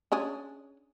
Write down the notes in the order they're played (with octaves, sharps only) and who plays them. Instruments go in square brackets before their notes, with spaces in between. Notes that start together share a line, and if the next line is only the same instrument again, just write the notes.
[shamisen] C#4 D4 G#4